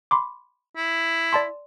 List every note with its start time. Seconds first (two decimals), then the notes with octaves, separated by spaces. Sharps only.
0.11 B5 C6 D6
0.77 E4
1.33 D5 A5 C6